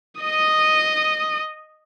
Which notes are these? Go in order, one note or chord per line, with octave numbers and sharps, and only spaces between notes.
D#5 D#6